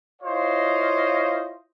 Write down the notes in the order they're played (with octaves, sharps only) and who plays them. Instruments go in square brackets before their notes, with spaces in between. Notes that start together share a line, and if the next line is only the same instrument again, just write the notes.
[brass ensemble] E4 F4 C5 C#5 D#5 F5